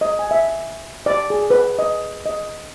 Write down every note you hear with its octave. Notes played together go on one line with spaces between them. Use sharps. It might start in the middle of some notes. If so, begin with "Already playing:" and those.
D#5
G#5
E5
D5
G#4
B4
D#5
D#5